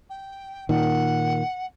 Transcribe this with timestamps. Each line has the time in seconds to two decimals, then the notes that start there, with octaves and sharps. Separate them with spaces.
0.10 G5
0.69 A#2 D#3 F#5